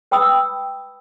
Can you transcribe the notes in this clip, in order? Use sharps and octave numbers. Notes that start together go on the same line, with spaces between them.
B4 G5 B5 D#6 E6